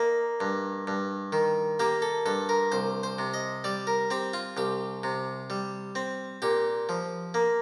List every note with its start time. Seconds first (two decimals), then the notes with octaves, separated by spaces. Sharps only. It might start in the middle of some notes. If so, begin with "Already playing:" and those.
Already playing: A#3 D#4
0.40 G2
0.87 G2
1.32 D#3
1.80 A#3 G4
2.02 A4
2.26 G2 A4
2.49 A#4
2.72 C2 C5
3.03 C5
3.19 C3
3.34 D#5
3.64 G3 D5
3.87 A#4
4.10 C4 G4
4.33 F4
4.57 C2 G4
5.03 C3
5.50 G3
5.95 C4
6.42 A#2 G4
6.89 F3
7.34 A#3